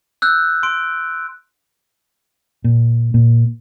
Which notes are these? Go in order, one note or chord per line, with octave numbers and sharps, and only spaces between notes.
E6 F#6 G6
C6 D7
A#2
A#2